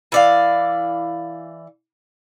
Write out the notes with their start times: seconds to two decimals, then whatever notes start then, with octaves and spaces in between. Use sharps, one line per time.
0.12 E3 D5 F5